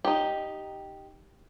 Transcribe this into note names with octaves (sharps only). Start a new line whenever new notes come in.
D#4 G4